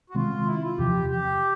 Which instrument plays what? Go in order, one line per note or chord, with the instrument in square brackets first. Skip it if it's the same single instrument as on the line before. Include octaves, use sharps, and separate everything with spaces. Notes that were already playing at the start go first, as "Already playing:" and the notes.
[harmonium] F#4
[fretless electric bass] C3 D#3 G#3 C4 [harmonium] F4
[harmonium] E4
F4
[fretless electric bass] E2 C3 F3 [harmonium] G4
[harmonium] G4